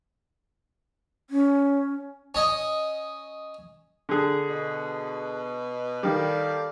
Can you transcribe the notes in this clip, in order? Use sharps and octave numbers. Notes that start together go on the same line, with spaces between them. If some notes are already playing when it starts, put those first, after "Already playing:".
C#4
C#4 D#5
D3 G#4
B2
D#3 G3 A4 D5 F5